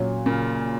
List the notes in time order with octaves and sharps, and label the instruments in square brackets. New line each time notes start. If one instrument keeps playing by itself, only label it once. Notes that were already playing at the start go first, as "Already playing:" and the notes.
Already playing: [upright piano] A#2 F#3 C#4
[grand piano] A#2 C#3